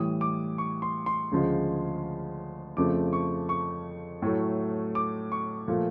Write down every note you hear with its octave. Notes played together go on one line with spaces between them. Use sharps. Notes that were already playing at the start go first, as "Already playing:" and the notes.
Already playing: A2 E3 G3 D#6
D6
C#6
C6
C6
D2 C#3 F3 G#3
F2 C#3 F3 A3 D6
C#6
C#6
A2 F#3 A3
D6
C#6
A#2 F3 A3